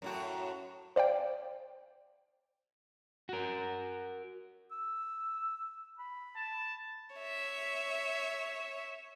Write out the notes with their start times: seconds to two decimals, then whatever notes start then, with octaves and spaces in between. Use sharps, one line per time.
0.02 F#2 A2 F#4
0.96 C5 D5 F5 G5
3.29 F#4 A#4
4.72 E6
5.99 B5
6.36 A5
7.16 C#5 E5